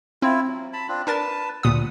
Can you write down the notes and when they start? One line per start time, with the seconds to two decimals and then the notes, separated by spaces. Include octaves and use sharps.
0.22 C4 E4 F4
0.47 F#3
0.73 A5 B5
0.88 C4 D4 F4
1.07 D4 A#4 B4 A5 A6
1.63 D2 A#2 F#5 D#6